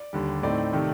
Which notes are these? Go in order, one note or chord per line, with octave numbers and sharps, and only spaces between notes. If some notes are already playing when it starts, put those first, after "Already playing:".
Already playing: D5
D#2 D3 G3
A2 A3 C4 D#4 D5
C3 D#3 A3